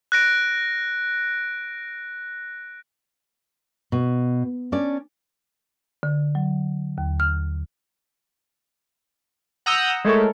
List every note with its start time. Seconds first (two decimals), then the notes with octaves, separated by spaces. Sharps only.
0.12 F#6 A#6 D7
3.92 B2
4.72 C#4 D4 D5
6.03 D3
6.35 F#3
6.98 D#2
7.20 F6
9.66 F#5 A#5 D#6 E6 G6
10.05 G#3 A3 E4 A4 A#4 C#5